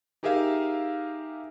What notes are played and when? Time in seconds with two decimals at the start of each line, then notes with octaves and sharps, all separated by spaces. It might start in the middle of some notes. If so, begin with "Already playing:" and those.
0.23 D#4 G4 G#4 A#4 E5 F5